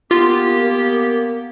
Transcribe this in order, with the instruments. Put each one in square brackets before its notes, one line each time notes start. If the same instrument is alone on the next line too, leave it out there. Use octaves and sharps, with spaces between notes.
[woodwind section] A#3 B3 [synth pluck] F4 [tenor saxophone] G4 [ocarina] A#4